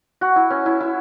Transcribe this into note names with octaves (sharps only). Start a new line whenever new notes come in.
F#4
E4
C#4
E4
E4